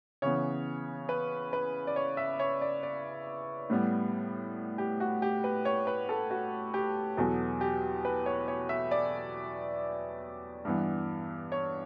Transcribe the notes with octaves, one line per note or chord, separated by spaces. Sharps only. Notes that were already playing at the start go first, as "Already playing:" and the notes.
C#3 E3 B3 C#5
B4
B4
D5
C#5
E5
C#5
D5
D5
A2 G3 B3
G4
F#4
G4
B4
C#5
B4
A4
F#4
G4
E2 B2 F#3 B3 A4
G4
B4
C#5
C#5
E5
D5
G2 E3 B3
C#5